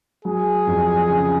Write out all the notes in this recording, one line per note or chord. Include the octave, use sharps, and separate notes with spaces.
F#3 G#4
F2
C#3